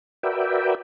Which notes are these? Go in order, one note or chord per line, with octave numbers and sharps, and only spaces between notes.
F#4 A#4 B4 D5 E5 G5